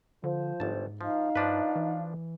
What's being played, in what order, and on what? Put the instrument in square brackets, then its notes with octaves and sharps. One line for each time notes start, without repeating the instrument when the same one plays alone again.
[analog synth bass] D3 [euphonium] F3 [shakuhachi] C5
[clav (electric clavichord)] G1 A5 [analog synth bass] G#2
[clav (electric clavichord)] F3 [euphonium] D#4 [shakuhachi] F5
[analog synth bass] G2 [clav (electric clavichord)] F3 D4 B4
[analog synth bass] E3